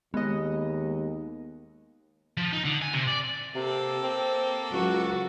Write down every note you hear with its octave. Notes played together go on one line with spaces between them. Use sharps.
D#2 G#3 B3 D#5
F3
D#4
D3
G#5
C3
D5
C3 A#3 A4
C4
C#2 F#3 F#4